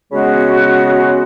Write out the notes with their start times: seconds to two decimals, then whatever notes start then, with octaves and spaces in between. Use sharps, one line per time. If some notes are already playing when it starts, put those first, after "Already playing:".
0.11 C#3 G#3 B3 F#4